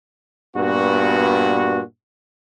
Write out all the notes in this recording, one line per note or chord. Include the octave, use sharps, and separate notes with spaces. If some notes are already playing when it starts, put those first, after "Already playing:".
G2 A#2 B3 F#4